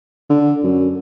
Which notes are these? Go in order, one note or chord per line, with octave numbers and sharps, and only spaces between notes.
D3
F#2